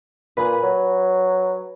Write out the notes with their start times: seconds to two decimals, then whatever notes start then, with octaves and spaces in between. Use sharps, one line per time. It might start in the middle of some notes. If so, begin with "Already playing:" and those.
0.37 A#2 G#4 B4
0.63 F#3